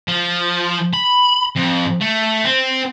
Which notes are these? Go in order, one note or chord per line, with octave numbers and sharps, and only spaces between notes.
F3
B5
F2
A3
C4